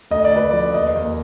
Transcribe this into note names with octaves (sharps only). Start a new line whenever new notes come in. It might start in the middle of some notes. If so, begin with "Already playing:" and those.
D2 D#5
D5
D2 B4
F3 D5
D#2 D#5
D#2